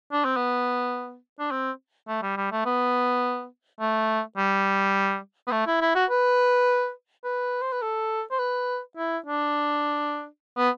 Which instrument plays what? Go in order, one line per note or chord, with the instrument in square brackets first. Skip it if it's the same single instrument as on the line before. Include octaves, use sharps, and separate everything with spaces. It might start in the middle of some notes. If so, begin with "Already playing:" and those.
[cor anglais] D4
C4
B3
D4
C4
A3
G3
G3
A3
B3
A3
G3
B3
A3
E4
E4
F#4
B4
B4
C5
B4
A4
C5
B4
E4
D4
B3